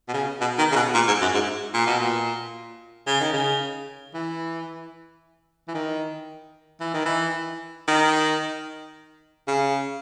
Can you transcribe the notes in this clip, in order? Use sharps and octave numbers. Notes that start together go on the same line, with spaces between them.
B2
C#3
B2
D#3
C#3
B2
A#2
G#2
F#2
G#2
A#2
B2
A#2
C#3
D#3
C#3
E3
E3
D#3
E3
D#3
E3
D#3
C#3